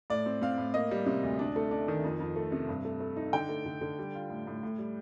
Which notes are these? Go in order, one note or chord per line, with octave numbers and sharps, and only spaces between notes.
A2 D5
C4
C4 F5
A2
A#3 D#5
G3
C3
D2
D4
A3
D4
D#3
F2
F2
A3
C3
G2
A3
A3
D#4
D3 G5
A3
D3
D3
G3
F4
A2
A2
A2
G3